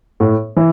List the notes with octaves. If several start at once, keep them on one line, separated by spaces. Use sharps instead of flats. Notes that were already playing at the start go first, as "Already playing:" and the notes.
A2
E3